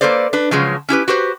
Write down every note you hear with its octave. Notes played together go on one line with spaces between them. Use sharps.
A#3 A4 B4 C5 D5
D4 B4
C#3 F3 F#3 G#3
C#4 E4 G4 B4
F#4 G4 B4 C5